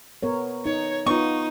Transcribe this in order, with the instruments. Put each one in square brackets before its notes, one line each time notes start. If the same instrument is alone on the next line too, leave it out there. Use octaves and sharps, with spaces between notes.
[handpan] B3 A#4 C#5
[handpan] D#4 [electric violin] C#5
[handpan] B3 F4 [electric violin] D#4 [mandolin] C#6